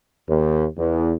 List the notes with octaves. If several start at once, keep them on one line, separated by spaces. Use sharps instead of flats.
D#2
E2